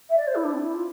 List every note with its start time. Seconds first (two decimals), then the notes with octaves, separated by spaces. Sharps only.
0.10 E5
0.17 D5
0.27 C5
0.36 E4
0.44 D4
0.53 C4
0.63 E4
0.75 F4